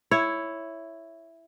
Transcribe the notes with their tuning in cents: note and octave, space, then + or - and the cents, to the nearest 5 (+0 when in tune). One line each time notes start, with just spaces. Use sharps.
E4 +5 C#5 +0